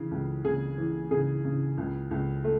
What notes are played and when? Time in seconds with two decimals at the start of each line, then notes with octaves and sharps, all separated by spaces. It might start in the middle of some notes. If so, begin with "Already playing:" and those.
Already playing: C#3 E3
0.11 C#2
0.44 C#3 G#4
0.78 E3
1.11 C#3 G#4
1.45 C#3
1.77 C#2
2.11 C#2
2.44 A3